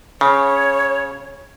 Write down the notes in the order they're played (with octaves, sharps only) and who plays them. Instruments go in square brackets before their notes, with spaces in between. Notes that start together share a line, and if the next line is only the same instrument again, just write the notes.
[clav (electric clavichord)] C#3 [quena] C#5